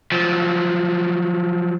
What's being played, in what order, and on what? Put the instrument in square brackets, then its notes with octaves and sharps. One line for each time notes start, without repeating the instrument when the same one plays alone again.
[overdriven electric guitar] F3 F#3